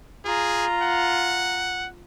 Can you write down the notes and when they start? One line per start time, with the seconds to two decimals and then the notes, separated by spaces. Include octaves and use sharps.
0.25 F4 G#4 A#5
0.82 F#5